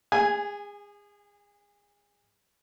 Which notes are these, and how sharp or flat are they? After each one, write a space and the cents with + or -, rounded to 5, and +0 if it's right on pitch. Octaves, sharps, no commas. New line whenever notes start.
G#4 -30 G#5 +0